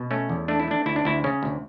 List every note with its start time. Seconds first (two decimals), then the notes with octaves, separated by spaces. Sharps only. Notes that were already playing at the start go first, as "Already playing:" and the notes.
Already playing: B2
0.11 A3 C#4
0.29 E2
0.48 A3 D4
0.60 E4
0.68 A3 D4
0.86 D2 E4
0.96 D4
1.05 D2 E4
1.24 C#3 C#4
1.43 D2